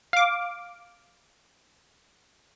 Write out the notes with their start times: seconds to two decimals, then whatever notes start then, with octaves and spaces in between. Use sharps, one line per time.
0.13 F5 D6